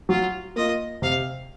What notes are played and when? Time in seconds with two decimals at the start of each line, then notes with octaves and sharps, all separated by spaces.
0.09 F#3 F4
0.56 A#3 F4 D#5
1.02 C3 F5